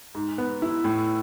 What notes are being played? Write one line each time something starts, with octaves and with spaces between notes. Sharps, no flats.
G#2
B3
E4
A2